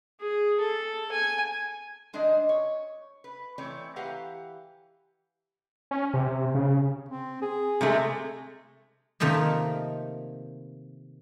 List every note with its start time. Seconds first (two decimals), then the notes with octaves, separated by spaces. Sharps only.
0.20 G#4
0.60 A4
1.12 G#5
2.13 D#3 G#3 D4 D5 D#5
2.49 C#5
3.24 B4
3.58 E3 A3 C4 C#5 D5
3.96 E3 G4 B4 F5 F#5 A#5
5.91 C#4
6.14 C3
6.55 C#3
7.09 C4
7.42 G#4
7.81 C3 G#3 A3
9.20 C3 D#3 F3 A3 A#3